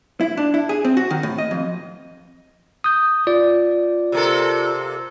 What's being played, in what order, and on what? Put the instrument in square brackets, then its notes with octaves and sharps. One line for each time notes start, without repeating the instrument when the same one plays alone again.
[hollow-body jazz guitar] E4
D4
E4
G#4
C4
F#4
D#3
A2
D#5
F2
[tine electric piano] D#6 G6
F4 D5
[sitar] C3 A#3 A4